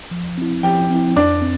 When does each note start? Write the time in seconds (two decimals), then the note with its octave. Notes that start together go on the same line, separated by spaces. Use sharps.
0.11 F3
0.38 C4 E4
0.63 F3 G4 G5
0.90 C4 E4
1.16 F2 D4 D5
1.42 C4